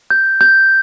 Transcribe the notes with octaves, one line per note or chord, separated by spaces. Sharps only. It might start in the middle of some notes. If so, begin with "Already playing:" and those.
G6
G6